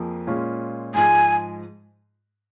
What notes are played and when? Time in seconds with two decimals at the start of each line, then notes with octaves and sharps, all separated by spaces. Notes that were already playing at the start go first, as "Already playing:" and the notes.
Already playing: F2 F3 A#3 G#4
0.27 A#2 G#3 C#4 F4
0.94 G#2 F3 G#3 G#5